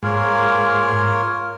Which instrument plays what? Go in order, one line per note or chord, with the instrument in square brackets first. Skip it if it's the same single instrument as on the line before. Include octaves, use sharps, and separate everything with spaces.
[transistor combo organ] G#2 [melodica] A#3 F4 A#4 C#5